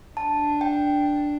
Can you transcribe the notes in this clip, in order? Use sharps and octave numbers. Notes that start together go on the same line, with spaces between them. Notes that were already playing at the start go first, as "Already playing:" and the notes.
D4 A5
G5